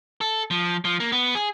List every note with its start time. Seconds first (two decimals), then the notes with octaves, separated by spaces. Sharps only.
0.21 A4
0.51 F3
0.85 F3
1.00 A#3
1.12 B3
1.35 G#4